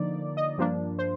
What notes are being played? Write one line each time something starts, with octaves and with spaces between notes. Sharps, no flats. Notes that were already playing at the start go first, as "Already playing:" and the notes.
Already playing: D3 F3 A#3 D#4 D5
D#5
G2 F3 A#3 D4
C5